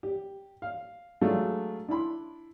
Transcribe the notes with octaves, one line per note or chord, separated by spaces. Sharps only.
G4
F5
F#3 G#3 A3 D4 F4
D4 E4 B5 C6